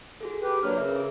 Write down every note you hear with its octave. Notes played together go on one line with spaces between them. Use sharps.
F#4 G#4 A4
G4 B4
F#3 A#3 D4 B4 C#5 F6
C#3 A#4 E5
G#4